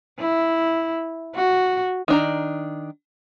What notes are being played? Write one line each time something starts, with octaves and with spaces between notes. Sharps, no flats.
E4
F#4
D#3 D4 A#5